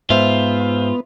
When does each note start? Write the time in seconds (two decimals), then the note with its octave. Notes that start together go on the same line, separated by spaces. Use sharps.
0.10 G#2 B3 F4 C5 E5